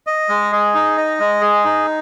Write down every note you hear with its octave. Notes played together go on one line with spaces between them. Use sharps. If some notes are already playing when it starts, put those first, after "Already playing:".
D#5
G#3
G#4
D#4
D#5
G#3
G#4
D#4